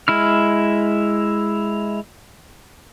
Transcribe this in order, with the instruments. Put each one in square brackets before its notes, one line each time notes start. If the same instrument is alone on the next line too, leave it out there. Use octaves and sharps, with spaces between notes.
[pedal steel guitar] G#3 E4 F6